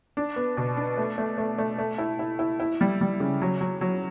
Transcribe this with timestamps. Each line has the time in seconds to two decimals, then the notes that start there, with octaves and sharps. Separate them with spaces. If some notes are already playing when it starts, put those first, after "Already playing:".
0.17 D4
0.36 B3
0.57 B2
0.77 D4
0.98 A3
1.18 A3
1.38 A3
1.58 A3
1.79 A3
1.98 E4
2.19 E4
2.39 E4
2.60 E4
2.81 G3
3.01 G3
3.20 C#3
3.42 F#3
3.61 F#3
3.81 F#3